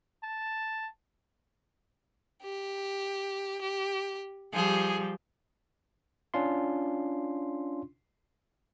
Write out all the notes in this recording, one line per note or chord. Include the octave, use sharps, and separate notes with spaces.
A5
G4
G4
F3 G3 G4 G#4
C#4 D4 F4 C6